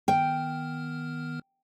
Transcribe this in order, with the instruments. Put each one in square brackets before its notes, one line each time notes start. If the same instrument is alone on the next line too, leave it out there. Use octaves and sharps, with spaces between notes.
[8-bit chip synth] D#3 B3 F6 [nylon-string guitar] G5